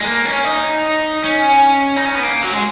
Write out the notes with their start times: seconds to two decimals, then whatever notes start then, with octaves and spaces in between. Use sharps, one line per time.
0.01 G#3
0.04 A#3
0.25 C#4
0.44 D#4
1.24 C#4
1.96 D#4
2.05 C#4
2.15 B3
2.23 A#3
2.43 F#3
2.52 G#3